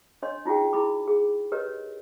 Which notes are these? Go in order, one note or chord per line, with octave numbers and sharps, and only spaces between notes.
D4 C#5 D#5 C6
D#4 F4 F#4 G#4 G5
E4 G#4 B5 D6
G#4
G4 A#4 B4 C#5 D#5